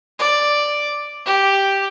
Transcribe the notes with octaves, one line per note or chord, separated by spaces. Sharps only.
D5
G4